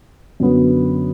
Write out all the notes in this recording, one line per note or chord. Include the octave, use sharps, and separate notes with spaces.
F#2 D3 F#3 B3